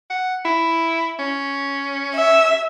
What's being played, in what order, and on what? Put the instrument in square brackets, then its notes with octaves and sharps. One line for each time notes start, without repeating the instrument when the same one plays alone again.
[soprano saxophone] F#5
E4
C#4
[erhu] E5